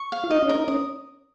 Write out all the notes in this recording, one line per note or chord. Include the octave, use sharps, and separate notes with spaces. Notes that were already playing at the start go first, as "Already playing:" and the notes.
Already playing: C#6
F5
F4
D#4 D#5
C#4
A#4
D#4
C#4 D#6